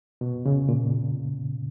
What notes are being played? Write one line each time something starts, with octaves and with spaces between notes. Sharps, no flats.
B2
C#3
A#2